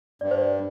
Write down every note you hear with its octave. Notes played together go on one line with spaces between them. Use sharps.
G2 D5
C5
D5